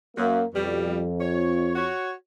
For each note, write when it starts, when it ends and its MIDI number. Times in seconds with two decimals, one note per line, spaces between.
0.17 0.42 42
0.17 0.44 58
0.54 1.91 41
0.54 1.01 47
0.54 1.01 55
1.20 1.71 73
1.75 2.12 66
1.75 2.12 73